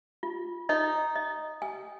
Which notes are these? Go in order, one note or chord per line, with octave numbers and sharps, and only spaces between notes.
F4
D#4 D#5
D#5
G#5